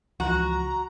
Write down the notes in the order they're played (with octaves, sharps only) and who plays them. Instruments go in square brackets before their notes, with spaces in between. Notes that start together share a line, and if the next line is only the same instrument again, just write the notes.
[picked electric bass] C#2 E3 F3 [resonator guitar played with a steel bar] F#4 [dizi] A#5